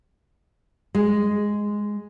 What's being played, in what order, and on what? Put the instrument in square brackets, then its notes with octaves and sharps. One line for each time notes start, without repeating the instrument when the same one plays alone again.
[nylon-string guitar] G#3